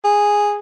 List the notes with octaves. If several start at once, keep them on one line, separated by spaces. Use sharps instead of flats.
G#4